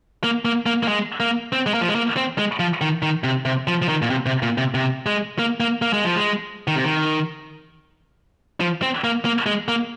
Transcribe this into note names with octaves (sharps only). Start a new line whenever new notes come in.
A#3
A#3
A#3
A#3
G#3
A#3
C4
G#3
A#3
F3
G#3
A#3
C4
G#3
F3
D#3
D#3
C3
C3
F3
F3
D#3
A#2
C3
C3
A#2
C3
C3
G#3
A#3
A#3
A#3
G#3
F3
G#3
D#3
C3
D#3
F3
C4
A#3
A#3
G#3
A#3